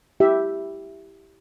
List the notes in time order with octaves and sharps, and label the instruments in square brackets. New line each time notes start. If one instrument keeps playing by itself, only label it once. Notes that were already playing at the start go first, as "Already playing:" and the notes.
[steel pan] E4 G4 E5